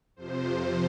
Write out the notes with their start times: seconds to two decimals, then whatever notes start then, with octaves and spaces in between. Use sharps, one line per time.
0.16 F2 C3 F3 C5